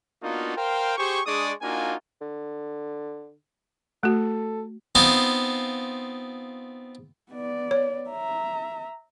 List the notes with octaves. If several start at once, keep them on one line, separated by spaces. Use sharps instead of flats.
A#3 B3 D4 D#4 F4 F#4
A#4 C5 F5 G5
G4 G#4 C5 C#6
G#3 D4 G#4 D5 C#6 D#6
A#3 D4 D#4 F4 F#4 G#5
D3
A3 F#4 A4
B3 C4 D#4 F4 G#5 A5
B3 D5
C#5
E5 A#5